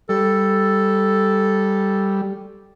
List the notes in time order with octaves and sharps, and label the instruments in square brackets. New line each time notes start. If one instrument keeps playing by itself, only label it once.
[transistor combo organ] G3 [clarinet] A4